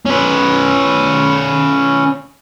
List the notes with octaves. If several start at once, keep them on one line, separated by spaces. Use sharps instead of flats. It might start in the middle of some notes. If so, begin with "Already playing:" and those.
C#4 B4